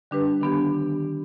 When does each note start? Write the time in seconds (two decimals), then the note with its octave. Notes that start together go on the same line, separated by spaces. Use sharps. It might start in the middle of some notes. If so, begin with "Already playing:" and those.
0.11 D3 G3 D4 G4 B4
0.41 D#3 B3 D4 G4